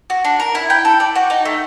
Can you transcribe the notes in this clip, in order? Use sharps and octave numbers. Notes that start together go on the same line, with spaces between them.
F#4
D4
A#4
E4
G5
A4
D5
F#4
D#4
A3